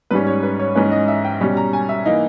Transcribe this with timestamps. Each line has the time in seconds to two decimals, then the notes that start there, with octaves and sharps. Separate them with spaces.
0.11 G#2 G3 C#4 B4
0.27 C#5
0.43 B4
0.60 C#5
0.75 G#2 E3 G#3 C#4 B4
0.92 D#5
1.08 E5
1.25 G5
1.40 B2 G3 C#4
1.57 A#5
1.73 G#5
1.89 E5
2.06 E3 A#3 D#4 D#5